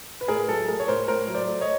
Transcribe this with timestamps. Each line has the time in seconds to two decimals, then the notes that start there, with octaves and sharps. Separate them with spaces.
0.21 B4
0.28 A2 G#4 A#4
0.48 F#3 A4
0.68 A3 G#4 A#4
0.80 C#5
0.88 A2 A#4 C5
1.08 A2 A#4 C5
1.28 F#3
1.35 C5 D5
1.48 A3
1.61 C#5 D#5